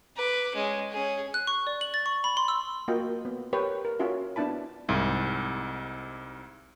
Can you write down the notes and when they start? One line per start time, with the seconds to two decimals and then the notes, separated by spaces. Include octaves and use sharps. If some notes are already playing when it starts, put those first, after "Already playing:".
0.16 B4 D6
0.55 G#3 C#4
0.92 C#4 G#4
1.34 F#6
1.47 C#6
1.67 D5
1.81 F#7
1.94 A6
2.06 C#6
2.24 B5
2.37 C6
2.48 E6
2.88 A#3 F4 F#4 D#5 G5
3.25 B3
3.53 G4 A#4 B4 C#5 G5
3.85 A#4
4.00 C#4 F4 F#4 E5
4.36 B3 D4 E4 A5 B5
4.89 C2 G#2